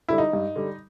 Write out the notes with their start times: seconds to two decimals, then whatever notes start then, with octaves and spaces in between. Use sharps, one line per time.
0.08 D3 G3 E4
0.18 D#4
0.33 G2
0.56 D3 G3